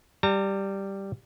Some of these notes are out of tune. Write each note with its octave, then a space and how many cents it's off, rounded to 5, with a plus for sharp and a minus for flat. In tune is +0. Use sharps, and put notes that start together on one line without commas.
G3 +0 A#5 -40